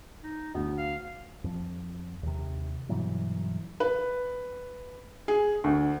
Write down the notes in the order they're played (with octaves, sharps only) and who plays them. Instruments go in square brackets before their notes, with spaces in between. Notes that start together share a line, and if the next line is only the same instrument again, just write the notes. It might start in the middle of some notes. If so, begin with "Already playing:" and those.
[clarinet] D#4
[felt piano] D2 [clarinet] B3
[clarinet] F5
[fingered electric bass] F2 F3
D#2 C3
G2 B2 E3 F#3
[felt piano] B4
G#4
D2